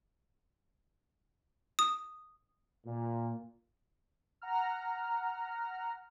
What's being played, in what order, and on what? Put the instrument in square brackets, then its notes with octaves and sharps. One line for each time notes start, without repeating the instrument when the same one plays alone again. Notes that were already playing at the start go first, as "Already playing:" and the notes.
[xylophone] D#6
[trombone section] A#2
[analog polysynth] F#5 A#5 F6